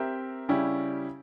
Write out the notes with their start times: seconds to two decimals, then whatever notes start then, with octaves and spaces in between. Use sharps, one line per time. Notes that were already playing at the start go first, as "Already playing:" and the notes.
Already playing: C4 G4 A#4 E5
0.48 C#3 G3 C#4 E4 G4